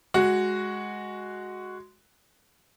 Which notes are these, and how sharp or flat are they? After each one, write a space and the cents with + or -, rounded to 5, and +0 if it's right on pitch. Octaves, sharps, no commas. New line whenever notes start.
G#3 +0 F#4 +0